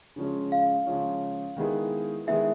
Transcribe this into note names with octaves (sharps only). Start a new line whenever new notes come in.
C#3 F3 G#3 C#4
F5
C#3 F3 G#3 C#4
D#3 G#3 B3 E4 G#4
D#3 G#3 B3 E4 G#4 E5